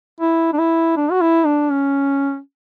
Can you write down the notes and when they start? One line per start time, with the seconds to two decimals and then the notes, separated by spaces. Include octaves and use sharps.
0.21 E4
0.53 D4
0.58 E4
0.97 D4
1.11 F#4
1.21 E4
1.46 D4
1.71 C#4